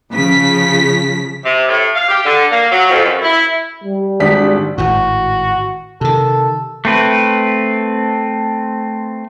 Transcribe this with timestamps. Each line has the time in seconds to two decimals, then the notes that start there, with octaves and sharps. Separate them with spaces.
0.11 C#3 F3 B6
1.44 C3
1.67 A2
1.95 F5
2.08 G4
2.25 D3
2.50 A#3
2.71 F#3
2.90 F2
3.04 F#2
3.21 E4
3.84 G3
4.20 G#1 D4 B6
4.78 G#1 A2 F#4
6.01 C3 D#3 A4
6.85 A3 C4 B4